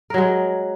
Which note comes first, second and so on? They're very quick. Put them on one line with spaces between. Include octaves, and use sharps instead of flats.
A#4 F#3 G#3